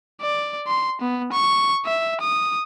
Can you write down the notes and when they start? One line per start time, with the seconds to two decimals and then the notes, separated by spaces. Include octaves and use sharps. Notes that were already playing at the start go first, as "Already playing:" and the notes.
0.22 D5
0.68 C6
1.01 B3
1.32 C#6
1.86 E5
2.21 D#6